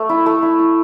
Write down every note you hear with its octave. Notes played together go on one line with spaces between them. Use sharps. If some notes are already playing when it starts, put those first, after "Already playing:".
Already playing: A3
E4
A3
E4
E4